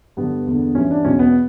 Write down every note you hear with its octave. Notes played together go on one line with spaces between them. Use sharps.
G2 D3 B3
E2 D3
G2 E3 C#4
D4
E2 B2 C#4
B3